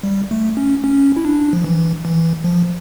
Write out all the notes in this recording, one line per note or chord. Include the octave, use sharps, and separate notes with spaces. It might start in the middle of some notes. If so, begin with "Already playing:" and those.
G3
A3
C#4
C#4
E4
D4
F3
E3
E3
F3